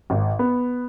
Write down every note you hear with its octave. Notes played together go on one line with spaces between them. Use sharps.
G#1
B3